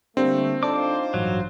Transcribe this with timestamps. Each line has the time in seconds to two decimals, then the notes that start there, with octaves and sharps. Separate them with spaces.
0.17 D3 G3 A3 A#3 C4
0.63 D4 D#4 F4 A4 C5 D6
1.14 A1 G2 F#3